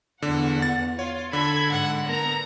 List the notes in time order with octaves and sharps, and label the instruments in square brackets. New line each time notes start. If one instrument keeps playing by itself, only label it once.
[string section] E2 F#5 [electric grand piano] D3
[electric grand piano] A6
[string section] F4 [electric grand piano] C#5
[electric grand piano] D3 [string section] A4 G#6 [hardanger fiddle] B5
[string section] G#2 [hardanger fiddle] F#5
[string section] B3 A#5 A#6 [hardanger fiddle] A#4